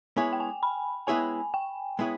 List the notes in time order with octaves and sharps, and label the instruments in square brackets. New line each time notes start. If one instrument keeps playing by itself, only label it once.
[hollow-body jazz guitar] G#3 B3 E4 G#4 C#5 [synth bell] G#5
[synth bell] G5
G#5
B5
[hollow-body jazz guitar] G#3 B3 E4 G#4 C#5 [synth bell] G#5
[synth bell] G5
[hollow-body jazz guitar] G#3 B3 E4 G#4 C#5